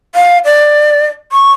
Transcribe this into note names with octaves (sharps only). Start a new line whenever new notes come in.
F5
D5
C#6